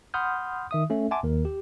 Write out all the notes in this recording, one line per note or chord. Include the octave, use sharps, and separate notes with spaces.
F#5 B5 C6 D#6 F6 G6
D#3 E5 D#6
A3 C#4 A4 E5
E5 F#5 G#5 A5 C6 D6
D#2 D#3 A#4
G4